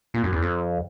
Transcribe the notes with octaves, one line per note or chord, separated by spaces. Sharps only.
A#2
F#2
E2
F2